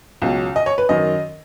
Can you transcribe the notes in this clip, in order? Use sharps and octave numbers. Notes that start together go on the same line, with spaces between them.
C#2 B2 F#3
D#5
C#5
B4
F#2 D#3 F#3 D#5